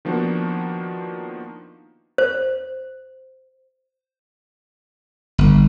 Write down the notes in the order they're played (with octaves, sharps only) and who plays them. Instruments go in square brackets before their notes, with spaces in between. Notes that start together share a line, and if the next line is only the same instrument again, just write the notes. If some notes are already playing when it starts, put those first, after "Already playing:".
[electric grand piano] D#3 F3 A#3 B3 D4 F#4
[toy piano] C5
[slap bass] G1